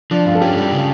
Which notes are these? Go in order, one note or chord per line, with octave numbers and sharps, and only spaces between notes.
F3 D4
G2 F4
A4
C#4 G4
G3
C#3